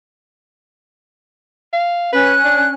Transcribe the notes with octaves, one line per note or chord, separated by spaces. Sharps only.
F5
C#4 B4 F#6
D4